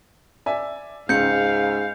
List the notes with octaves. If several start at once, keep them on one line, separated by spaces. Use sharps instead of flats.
D5 E5 G#5
C#2 G#2 F5 G6 C#7